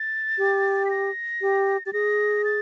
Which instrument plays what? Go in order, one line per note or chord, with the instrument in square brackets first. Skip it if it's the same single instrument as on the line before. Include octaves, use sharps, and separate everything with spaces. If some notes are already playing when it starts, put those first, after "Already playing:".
Already playing: [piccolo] A6
[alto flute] G4
[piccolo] B6
A#6
[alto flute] G4
[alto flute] G4 [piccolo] A6
[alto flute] G#4 [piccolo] A#6
[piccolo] A6